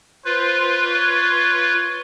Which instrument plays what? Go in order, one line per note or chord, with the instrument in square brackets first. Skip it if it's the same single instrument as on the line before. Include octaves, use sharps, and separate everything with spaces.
[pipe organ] F4 B4 [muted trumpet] C5
[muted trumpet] C#5